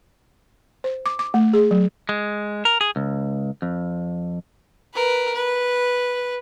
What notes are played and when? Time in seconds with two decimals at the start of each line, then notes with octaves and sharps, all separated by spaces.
0.84 C5
1.06 D6
1.19 D6
1.34 A3
1.53 G#4
1.71 F#3
2.09 G#3
2.65 A#4
2.81 G#4
2.96 C#2
3.62 F2
4.94 A#4 B4
5.34 B4